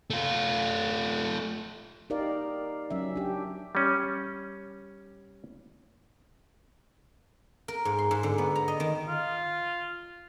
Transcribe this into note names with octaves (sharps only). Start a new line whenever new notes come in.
A3 F4
D#4 G4 A#4 D5 F5
F#3 C#4 E5
D4 G4
G3 C#4
A#4
G#2
C6
G#2
D3
B3
A#5
D#5
D#3
F4